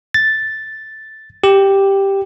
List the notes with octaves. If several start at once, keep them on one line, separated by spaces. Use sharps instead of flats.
A6
G4